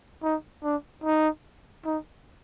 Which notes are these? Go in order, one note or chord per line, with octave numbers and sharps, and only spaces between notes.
D#4
D4
D#4
D#4